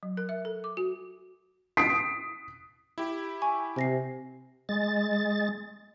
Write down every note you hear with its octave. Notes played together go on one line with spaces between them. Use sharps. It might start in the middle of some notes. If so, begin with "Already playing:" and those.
F#3
A#4
E5
A4
D6
F#4
D#6 B6 C7 D7
E4 G4
G#5 C#6
C3 G#5 A#6 C7
G#3 A6